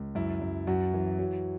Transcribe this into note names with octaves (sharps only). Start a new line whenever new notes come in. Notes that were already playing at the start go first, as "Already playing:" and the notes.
Already playing: C#2
F#2 E4
F#2
F#2 F#4
E3
F#3